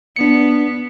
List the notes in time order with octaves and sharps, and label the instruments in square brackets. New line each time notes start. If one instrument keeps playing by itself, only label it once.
[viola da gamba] B3 [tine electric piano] D4 C#7